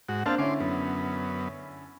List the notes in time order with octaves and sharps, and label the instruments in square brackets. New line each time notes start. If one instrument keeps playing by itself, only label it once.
[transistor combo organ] G#2 F#4
[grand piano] A#3 D4 C5 [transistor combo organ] C4 F5 A5
[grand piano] D3 C#4 E4 [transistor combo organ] C6 D6
[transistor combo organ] F#2 B3